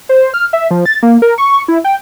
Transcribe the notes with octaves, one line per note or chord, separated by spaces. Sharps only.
C5
F6
E5
F3
A6
A#3
A#4
C#6
E4
G5